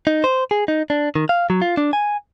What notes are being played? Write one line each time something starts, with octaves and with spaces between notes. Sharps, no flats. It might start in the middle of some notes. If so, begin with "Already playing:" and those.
D#4
C5
G#4
D#4
D4
D#3
F5
F#3
F4
D4
G#5